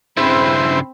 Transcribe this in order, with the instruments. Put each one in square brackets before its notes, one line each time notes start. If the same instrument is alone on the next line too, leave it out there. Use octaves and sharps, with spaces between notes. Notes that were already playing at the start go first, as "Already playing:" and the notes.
[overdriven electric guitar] G2 C#3 [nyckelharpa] C4 B5 [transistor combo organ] E4 C5